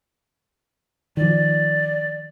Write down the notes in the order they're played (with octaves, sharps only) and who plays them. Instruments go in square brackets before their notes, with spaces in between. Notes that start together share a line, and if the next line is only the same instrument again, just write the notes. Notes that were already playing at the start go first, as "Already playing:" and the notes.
[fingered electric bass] D#3 F3 [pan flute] D5